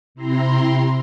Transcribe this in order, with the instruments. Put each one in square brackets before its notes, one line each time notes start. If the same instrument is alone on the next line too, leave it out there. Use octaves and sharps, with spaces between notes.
[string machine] C3 C4 E4 A#5 C6